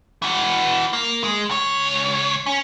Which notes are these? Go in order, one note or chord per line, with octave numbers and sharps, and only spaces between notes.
E3 F#4
A#3
G#3
C#2 C#5
C#4